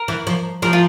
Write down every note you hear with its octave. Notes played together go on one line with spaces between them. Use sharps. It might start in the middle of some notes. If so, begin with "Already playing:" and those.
Already playing: A#4
E3
F3
F3 A#4
F4